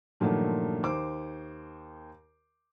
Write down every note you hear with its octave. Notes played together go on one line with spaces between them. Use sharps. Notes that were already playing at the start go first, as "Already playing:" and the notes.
G2 A#2 D#3 F3 F#3 A3
D#2 C5 D6